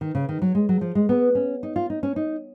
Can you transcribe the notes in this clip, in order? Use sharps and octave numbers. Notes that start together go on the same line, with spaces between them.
D#3
C#3
D#3
F#3
G#3
F#3
F3
G#3
B3
C#4
D#4
F4
D#4
C#4
D#4